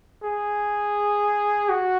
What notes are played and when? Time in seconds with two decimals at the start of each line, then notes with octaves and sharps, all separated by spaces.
0.24 G#4
1.69 F#4